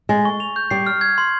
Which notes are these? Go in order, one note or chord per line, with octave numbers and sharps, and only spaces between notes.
G#3 A6
C#6
F7
G6
G3 C7
F6
G#6
C6